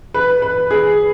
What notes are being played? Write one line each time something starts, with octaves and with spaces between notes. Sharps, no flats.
B4
B4
G#4